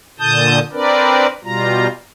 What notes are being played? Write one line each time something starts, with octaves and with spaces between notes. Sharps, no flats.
A#2 D3 A5 D#6 G6
C4 D4 A#4 B4 D5
B2 G3 F4 A#5